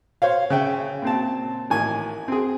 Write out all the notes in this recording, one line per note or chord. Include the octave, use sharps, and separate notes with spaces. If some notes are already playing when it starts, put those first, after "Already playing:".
C5 C#5 F5
C#3 E5 G5
A#2 C4 A5
A1 D#3 G#5
C4 G#4